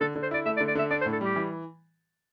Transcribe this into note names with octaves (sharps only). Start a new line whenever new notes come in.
D3 A4
D3
C5
E4 D5
A3 E5
D5
D3
D5
D3 E5
D4 D5
C5
A2
A4
G3 G4
E3